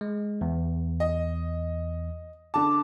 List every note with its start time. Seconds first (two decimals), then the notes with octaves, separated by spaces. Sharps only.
0.01 G#3
0.41 E2
1.00 D#5
2.54 D3 A5 D6